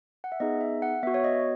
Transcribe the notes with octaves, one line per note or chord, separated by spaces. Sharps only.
F#5
E5
B3 D#4 G#4 D#5
E5
F#5
B3 F#4 E5
C#5
D#5